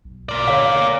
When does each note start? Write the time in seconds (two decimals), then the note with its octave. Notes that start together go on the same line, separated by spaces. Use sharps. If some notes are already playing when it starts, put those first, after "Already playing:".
0.05 B1
0.29 A#2 A#4 D5
0.48 D3 C#5 F5